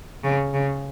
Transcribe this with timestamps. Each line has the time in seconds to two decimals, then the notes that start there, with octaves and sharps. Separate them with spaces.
0.24 C#3
0.54 C#3